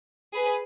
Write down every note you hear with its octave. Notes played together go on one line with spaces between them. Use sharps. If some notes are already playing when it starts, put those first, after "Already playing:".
G#4 B4